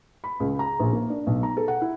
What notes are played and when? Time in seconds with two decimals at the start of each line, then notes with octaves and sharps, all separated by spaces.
0.24 B5
0.40 C#2
0.59 A#5
0.79 A#1
0.93 A#3
1.10 D4
1.27 B1
1.43 A#5
1.57 A4
1.68 F#5
1.81 E4